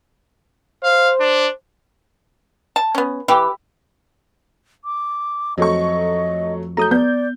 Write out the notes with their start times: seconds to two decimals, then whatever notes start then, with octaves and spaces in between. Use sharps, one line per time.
0.83 C5 F5
1.20 D4
2.76 A5
2.95 B3 C#4
3.28 E3 G4
4.85 D6
5.58 F2 F#3 A3 D#5 C#6
6.77 F#3 A3 A#5 D#6 G6
6.91 B3 D5 G6